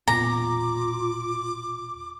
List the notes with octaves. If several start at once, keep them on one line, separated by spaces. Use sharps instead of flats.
E1 A#2 B3 F4 A#5 D6